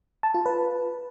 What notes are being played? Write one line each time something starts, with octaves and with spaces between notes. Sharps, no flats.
A5
F4
B4